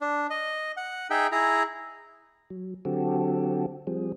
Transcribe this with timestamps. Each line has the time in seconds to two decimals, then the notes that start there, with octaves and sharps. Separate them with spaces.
0.01 D4
0.30 D#5
0.77 F#5
1.10 D#4 G#4 E5 G5
1.32 E4 G#4 A#5
2.50 F#3
2.85 D3 F#3 C4 F#4 G4 A4
3.87 F3 G3 C4 G#4